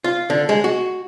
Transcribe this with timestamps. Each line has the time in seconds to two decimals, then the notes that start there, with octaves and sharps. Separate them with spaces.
0.04 F4
0.30 D3
0.49 G#3
0.64 F#4